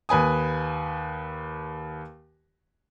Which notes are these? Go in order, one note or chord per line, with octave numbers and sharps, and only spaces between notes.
D#2 B4 G#5 D#6